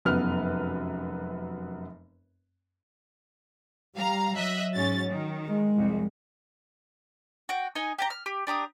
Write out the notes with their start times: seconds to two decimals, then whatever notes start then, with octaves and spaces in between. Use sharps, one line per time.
0.05 F1 F#2 B3 B4 F6
3.95 G3 F5 A#5
4.37 F#3 D#5 E5 F#6
4.75 G#2 C#4 A6
5.09 D#3
5.47 G#3
5.76 C2 F2
7.49 F#4 G5
7.75 D#4 D#5 G#5
7.98 G4 G#5 A#5
8.10 F6
8.26 G4
8.47 D4 G4 A#5 D#6